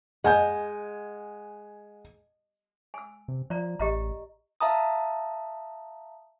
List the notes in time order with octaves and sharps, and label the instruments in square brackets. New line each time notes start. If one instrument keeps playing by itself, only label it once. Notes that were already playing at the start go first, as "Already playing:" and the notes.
[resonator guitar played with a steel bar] G#3 [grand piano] F#5 G#5 G6
[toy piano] G#5 E6
[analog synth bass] C3
[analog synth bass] F3 [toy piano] D5 A#5
[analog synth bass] A1 [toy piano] G4 D#5 A#5
[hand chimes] E5 F5 A5 A#5 D#6